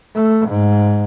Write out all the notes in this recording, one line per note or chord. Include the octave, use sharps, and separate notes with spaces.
A3
G#2